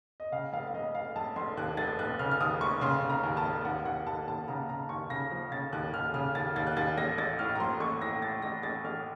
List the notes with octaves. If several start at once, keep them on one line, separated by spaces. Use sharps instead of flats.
D#5
C#3 F5
F1 F5
F5
F1 D#5
F1 F5
F1 A5
F1 C6
D#2 F#6
F1 A6
F1 F#6
C#3 F6
F6
D#2 D#6
F1 C#6
C#3 C6
C#3
A#5
D#2
A5
F1
D#2 F#5
D#2 F#5
D#2 A5
D#2 A5
C#3 A#5
C#3 A#5
D#2 C#6
C#3 A#6
F3
C#3 A6
D#2 F#6
D#2 F6
C#3 F6
D#2 A6
D#2 A6
F#6
D#2 A6
A1 A#6
A1 A6
A2 F6
A#5
F3 C6
A1 C#6
A2 A#6
A2 A6
A1 A#6
A1 A6
A1 F6